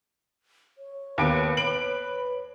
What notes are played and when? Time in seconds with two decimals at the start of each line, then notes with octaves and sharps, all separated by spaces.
0.78 C#5
1.18 D#2 B3 B4 D7
1.57 B4 D7 F#7